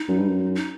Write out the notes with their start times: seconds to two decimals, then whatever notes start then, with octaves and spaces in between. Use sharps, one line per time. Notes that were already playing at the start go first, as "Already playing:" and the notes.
Already playing: D#4
0.08 F#2
0.19 G2
0.28 F#2
0.55 D#4